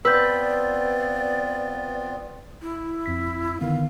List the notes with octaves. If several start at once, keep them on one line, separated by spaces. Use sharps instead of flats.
B3 C4 F4 B4 D5 E6 G6
E4
F2 B6
D3 D#3 B3 F5